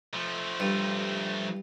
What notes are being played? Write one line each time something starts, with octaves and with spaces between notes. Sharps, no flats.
F3 A3
G2